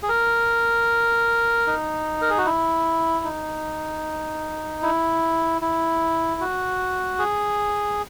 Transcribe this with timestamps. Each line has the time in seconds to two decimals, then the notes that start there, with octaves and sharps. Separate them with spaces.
0.03 G#4
0.09 A#4
1.67 D#4
2.22 A#4
2.30 G#4
2.38 F#4
2.46 E4
3.25 D#4
4.83 E4
5.62 E4
6.41 F#4
7.19 G#4